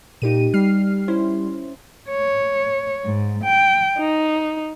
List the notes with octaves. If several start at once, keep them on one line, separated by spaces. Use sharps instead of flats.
A#2 D#4 G4 D#7
G3 F6 C7
C#4 E4 C5
C#5
G#2
G5
D#4